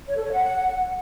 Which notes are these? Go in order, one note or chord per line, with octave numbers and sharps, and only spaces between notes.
C#5
A4
C#5
F#5